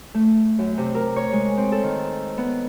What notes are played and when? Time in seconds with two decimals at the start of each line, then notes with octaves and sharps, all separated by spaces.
0.14 A3
0.59 F#2
0.78 C3
0.95 A#4
1.16 C#5
1.33 G#3
1.57 C4
1.72 A4
1.83 D#3
2.38 B3